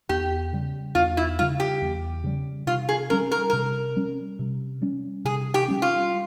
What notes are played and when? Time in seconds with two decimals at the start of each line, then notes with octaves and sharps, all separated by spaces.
0.09 E2 G4
0.53 C#3 G3
0.95 E2 F4
1.17 E4
1.39 C#3 G3 F4
1.60 G4
1.82 E2
2.24 C#3 G3
2.67 C3 F4
2.89 G#4
3.10 G3 C#4 A#4
3.32 A#4
3.50 C3 A#4
3.96 G3 C#4
4.39 C3
4.82 G3 C#4
5.25 C3 G#4
5.54 G4
5.68 G3 C#4
5.82 F4